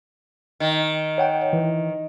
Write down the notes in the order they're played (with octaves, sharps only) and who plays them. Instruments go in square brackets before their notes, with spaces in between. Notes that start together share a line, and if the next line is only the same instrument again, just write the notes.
[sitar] D#3
[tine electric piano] C#5 F#5 G5
E3